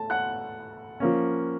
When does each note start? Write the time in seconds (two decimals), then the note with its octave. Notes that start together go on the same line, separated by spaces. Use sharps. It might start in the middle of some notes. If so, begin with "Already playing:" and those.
Already playing: A3 A5
0.10 F#5 F#6
1.00 F3 A#3 C#4